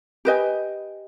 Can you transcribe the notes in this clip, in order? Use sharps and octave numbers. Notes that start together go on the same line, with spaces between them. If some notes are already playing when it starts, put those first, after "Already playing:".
G4 B4 D#5 G#5